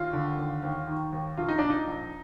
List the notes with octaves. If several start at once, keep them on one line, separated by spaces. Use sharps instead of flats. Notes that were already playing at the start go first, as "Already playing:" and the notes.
Already playing: D#2 F4
D3
D#2
D#2
D#3
D#2
A#1 F4
D#4
A#2 D4
D#4
A#1